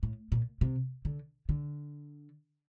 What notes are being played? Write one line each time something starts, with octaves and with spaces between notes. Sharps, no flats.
A2
A#2
C3
D3
D3